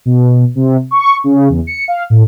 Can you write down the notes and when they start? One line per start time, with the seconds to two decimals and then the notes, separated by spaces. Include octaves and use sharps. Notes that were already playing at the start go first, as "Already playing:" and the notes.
0.05 B2
0.55 C3
0.91 C#6
1.24 C#3
1.49 E2
1.67 C#7
1.88 F5
2.10 A2